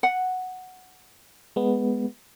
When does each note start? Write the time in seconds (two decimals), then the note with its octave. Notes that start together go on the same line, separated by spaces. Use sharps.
0.03 F#5
1.56 G#3 B3